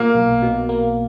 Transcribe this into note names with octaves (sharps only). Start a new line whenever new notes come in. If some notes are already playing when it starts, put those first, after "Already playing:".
Already playing: A#2 A#3
B1
B2
A#3